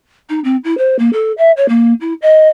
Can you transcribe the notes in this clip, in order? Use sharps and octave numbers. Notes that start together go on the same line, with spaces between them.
D#4
C4
E4
C5
A#3
A4
E5
C#5
A#3
E4
D#5